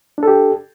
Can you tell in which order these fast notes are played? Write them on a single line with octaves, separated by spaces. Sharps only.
D4 A4 G4